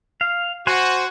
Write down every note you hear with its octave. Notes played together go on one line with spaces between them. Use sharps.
F5
F#4 C5 F#5 G#5